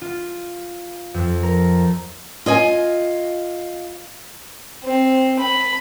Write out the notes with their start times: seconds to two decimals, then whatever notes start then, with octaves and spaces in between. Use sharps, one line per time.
0.02 F4
1.14 F2
1.43 A#4
2.46 F4 D#5 G#5
4.84 C4
5.39 B5